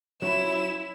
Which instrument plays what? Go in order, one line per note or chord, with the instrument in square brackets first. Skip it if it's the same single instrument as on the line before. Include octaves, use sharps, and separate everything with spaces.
[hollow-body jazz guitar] F#3 C#4 F4 [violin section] E4 [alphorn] C#5 [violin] E7